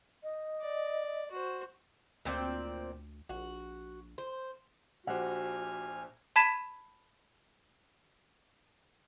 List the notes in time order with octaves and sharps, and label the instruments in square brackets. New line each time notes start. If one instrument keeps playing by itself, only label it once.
[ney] D#5
[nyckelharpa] D5
F#4 C5
[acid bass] D2 [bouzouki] A#2 C4 D5
[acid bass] A#1 [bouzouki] F#4
[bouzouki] C5
[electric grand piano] A#1 G4 C5 [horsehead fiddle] F#4 [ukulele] F#5 [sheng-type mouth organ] G#5 F6
[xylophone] A5 B5 G#6 B6 E7